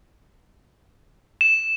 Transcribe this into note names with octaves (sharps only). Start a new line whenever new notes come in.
E7